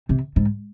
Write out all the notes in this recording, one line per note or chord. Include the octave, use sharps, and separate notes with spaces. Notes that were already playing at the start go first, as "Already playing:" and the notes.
C3
G#2